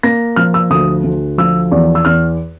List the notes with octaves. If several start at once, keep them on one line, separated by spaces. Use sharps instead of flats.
A#3 A#6
F3 F6
E6
D2 D#6
D2
F3 E6
E2
E6
E2 F6